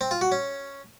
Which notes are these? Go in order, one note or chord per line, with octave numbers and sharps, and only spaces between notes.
C4
F4
F#4
C#4